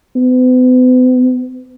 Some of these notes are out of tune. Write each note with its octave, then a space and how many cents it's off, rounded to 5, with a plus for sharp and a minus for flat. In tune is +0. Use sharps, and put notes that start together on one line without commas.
B3 +45